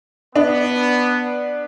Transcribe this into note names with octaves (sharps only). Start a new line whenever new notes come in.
B3 D4